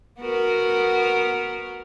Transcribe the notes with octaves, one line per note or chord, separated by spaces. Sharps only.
B3 F#4 A#4